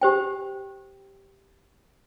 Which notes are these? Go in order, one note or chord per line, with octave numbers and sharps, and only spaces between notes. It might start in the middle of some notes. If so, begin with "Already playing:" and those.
G4 C5 G5